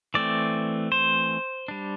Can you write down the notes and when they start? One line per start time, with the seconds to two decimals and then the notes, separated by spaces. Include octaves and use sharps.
0.14 E3 A3 C4 D5
0.92 C5
1.68 G3 D4